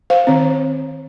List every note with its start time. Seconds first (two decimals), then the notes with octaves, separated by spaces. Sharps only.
0.10 C5 F5
0.27 D#3 C4